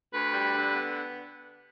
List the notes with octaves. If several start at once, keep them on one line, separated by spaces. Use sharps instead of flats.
D2 B4
G3
D3
B3